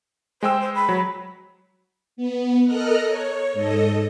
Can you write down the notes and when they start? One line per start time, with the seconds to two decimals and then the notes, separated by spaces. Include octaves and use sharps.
0.43 G#3 C5 G5 E6
0.61 C5
0.75 B5
0.89 F#3
2.17 B3
2.64 A4 A#4 D#5 A#5 F6 F#6
3.06 C#5
3.53 G#2 A4 D#5